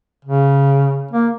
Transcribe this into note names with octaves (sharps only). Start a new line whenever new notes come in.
C#3
A#3